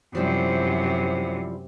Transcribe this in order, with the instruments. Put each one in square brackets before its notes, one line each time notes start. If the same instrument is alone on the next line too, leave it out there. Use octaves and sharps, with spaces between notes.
[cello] F#2 C3 [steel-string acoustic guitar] F3 G3 E4